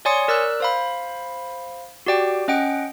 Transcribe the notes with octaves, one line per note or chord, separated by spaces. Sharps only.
C#5 D5 G#5 C6 D#6 C#7
A#4 D5 E6 F#6
C5 F5 B5
F#4 G4 D5 G5
C#4 D#5 F#5 G5 D7